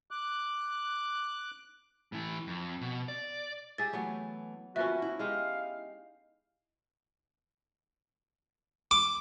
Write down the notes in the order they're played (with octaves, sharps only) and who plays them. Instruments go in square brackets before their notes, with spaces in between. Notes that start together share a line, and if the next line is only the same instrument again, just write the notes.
[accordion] D6 F#6
[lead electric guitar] A2 E3
F2
B2
D5
[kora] G4 G#4 E5 [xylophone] A6
[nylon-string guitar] E3 A3 [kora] F#3 B3
[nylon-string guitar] D#2 [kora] F3 B3 C#4 [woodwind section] F#4 [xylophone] E5
[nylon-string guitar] E4
[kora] G#3 D#4 G4 [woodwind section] F5
[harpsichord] D6